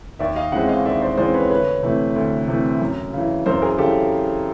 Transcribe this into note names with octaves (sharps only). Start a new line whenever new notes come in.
D#2 D5 E5
D#5 F5
C#3 E3 G#3 C4 E5 F#5
D#5 F5
D#2 D5 E5
C5 D5
C#3 E3 G#3 C4 C5 D5
B4 C#5
D2 B4 C#5
C3 E3 A3
D2
C3 E3 A3
F#2
C#3 E3
F#2 A#4 C5
G#4 A#4
C#3 E3 G4 A4